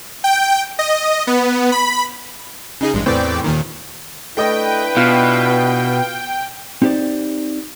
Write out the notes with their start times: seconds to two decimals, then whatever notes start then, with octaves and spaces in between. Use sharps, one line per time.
0.24 G5
0.79 D#5
1.27 B3
1.72 B5
2.81 C#3 D#4 G#4
2.94 A1 G2 G#3
3.06 E2 A2 E3 C4 D5 G5
3.44 D#2 A#2 D#3
4.37 A3 D4 E4 B4 D#5 G5
4.97 B2 F4 F6
6.82 C4 D#4 G4 C5 D5